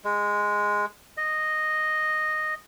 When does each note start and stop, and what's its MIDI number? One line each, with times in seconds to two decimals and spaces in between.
0.04 0.85 56
1.17 2.54 75